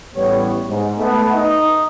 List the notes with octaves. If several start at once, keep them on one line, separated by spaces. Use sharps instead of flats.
A1 A2 G3 B3 C#5
G#2
A3 B3
D#4 D#5